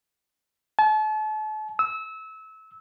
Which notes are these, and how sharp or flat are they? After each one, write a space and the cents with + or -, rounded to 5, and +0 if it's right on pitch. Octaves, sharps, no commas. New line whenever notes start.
A5 -40
E6 -25